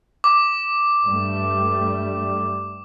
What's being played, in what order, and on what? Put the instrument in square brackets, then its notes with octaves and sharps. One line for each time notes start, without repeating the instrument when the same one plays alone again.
[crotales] D6
[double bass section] G2 G3 A3